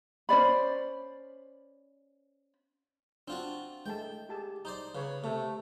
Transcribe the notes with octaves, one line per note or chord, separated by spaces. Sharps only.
C#4 C5 D5 B5
C4 D4 F4 F#4
G#3 A3 G5 A5
G4 G#4 A5
D#4 C5 D5
C#3 B4 C#5
C3 A3